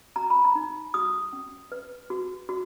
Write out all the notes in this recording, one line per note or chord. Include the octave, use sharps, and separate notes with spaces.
F#4 A#5
B5
A#5
D#4
F#4 D#6
C#4
B4
F#4
F#4